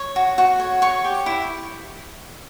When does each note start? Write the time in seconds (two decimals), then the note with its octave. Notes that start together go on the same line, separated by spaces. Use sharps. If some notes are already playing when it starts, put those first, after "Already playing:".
Already playing: C#5
0.16 F#4
0.38 F#4
0.60 C#5
0.82 C#5 C#6
1.04 G4
1.26 E4